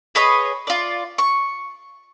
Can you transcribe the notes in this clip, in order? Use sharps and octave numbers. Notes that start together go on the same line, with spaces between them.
G#4 B4 C#5 D#5
F4 D5
C#6